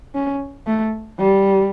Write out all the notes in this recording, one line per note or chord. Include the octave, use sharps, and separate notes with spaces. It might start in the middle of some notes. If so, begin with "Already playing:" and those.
C#4
A3
G3